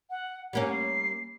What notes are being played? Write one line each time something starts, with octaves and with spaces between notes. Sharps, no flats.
F#5
G3 A#3 C#4 F#5
C7